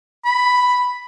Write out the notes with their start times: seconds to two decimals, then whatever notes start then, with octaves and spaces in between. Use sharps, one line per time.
0.25 B5